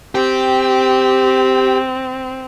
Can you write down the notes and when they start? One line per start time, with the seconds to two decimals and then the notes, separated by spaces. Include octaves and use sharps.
0.15 C4 G4